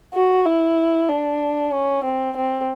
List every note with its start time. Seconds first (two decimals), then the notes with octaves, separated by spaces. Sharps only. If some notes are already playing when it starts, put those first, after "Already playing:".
0.14 F#4
0.46 E4
1.09 D4
1.72 C#4
2.04 C4
2.37 C4